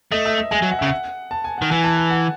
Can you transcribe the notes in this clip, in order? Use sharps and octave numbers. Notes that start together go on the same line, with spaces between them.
A3 D#5
E5
E5
G#3 G#5
F#3
F#5
E5
C#3
F#5
A5
G#5
D#3 F#5
E3 G#5
A5
G#5
F#5